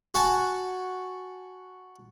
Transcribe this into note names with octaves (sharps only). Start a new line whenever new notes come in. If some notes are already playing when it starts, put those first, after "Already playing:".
F#4 F#5 G#5 A5